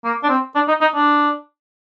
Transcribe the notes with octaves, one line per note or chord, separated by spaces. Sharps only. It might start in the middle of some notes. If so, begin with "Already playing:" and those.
A#3
D4
C4
D4
D#4
D#4
D4